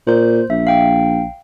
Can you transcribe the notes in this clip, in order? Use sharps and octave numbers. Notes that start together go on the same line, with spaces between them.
A#2 C5 G6
A#1 E5
F5 G5